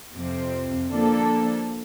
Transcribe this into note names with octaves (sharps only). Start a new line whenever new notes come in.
F2 C3 F3 C4
D3 F3 A#3 D4 A4